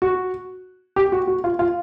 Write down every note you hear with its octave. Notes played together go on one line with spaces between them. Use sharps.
F#4
G4
F#4
F#4
F4
F4